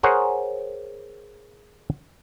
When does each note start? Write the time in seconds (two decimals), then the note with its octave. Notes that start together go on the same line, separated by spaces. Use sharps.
0.03 G#4 A#4 C5 C#5 F#5